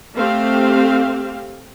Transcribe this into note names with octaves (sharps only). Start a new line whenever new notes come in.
A3 C4 G4 F5